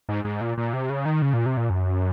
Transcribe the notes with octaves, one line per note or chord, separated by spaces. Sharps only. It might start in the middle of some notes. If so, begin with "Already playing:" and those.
G#2
G#2
A#2
A#2
C3
C#3
D#3
C#3
A#2
C3
A#2
F#2